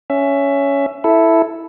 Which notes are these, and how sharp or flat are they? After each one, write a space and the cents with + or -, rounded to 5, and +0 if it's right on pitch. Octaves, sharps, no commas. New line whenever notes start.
C#4 +10 E5 +15
E4 +0 A4 +0